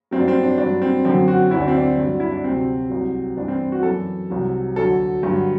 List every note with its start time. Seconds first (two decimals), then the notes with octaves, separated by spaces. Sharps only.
0.11 G2 F#3 C4
0.20 D4
0.28 C4
0.43 D4
0.58 G2 F#3 D4
0.82 C4
1.05 F#2 D3 F#3 C4
1.28 F#4
1.51 D2 D3 F#3 E4
1.60 D4
1.68 C4
1.77 D4
1.97 G2 D3 F#3
2.20 E4
2.32 D4
2.44 D2 C3 F#3 C4
2.90 C2 C3 F#3
3.37 G2 E3 D4
3.48 C4
3.72 F#4
3.83 F#2 E3 A4
4.30 C2 C3 F#3
4.76 D2 D3 F#3 A4
5.23 G2 D3 F#3